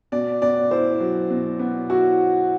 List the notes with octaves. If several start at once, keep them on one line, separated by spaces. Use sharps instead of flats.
B2 D5
B3 D5
E4 C5
F#3
B2
B3
E4 F#4